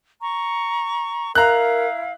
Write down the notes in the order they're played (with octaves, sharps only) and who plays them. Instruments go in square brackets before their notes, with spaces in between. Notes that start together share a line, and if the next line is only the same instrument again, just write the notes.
[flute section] A#5 C#6
[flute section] E4 F5 [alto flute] A#4 [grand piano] A#5 F#6